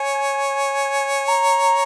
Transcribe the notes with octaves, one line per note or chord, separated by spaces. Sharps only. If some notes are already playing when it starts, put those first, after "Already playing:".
Already playing: C#5 G#5
A#5